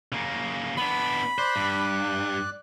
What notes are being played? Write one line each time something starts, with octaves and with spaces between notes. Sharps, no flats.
C#3 A#3
B3 D4 B5
C5 D5 F#6
G2